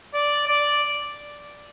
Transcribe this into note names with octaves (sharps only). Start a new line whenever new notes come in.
D5
D5